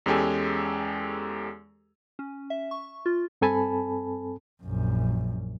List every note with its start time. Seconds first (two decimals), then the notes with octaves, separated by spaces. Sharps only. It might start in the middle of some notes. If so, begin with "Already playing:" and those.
0.06 E2 G#3 C#4 G4 A4 G#5
2.19 C#4
2.50 E5
2.71 C#6
3.06 F4
3.41 G2 C4 A4 G#5 A5 B5
4.63 A#1 F#2